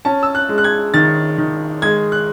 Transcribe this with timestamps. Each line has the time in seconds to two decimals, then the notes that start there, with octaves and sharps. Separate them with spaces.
0.05 C#4 A5
0.23 E6
0.35 F#6
0.49 G#3
0.58 F#6
0.64 G#6
0.94 D#3 A6
1.38 D#3
1.82 G#3 G#6
2.12 F#6